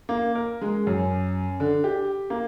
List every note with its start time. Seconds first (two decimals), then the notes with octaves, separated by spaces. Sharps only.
0.09 A#3
0.35 A#4
0.62 G#3
0.87 F#2
1.60 D3
1.84 G4
2.30 A#3